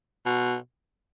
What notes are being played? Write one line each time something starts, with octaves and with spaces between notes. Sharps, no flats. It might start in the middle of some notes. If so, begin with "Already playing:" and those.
B2